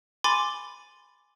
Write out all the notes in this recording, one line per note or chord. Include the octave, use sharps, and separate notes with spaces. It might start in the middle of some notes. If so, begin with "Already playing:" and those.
G#5 B5 C6 D6 A6